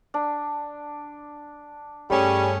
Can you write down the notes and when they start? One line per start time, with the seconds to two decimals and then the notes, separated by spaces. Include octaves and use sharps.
0.14 D4
2.10 G2 G3 A3 C#4 G#4 G5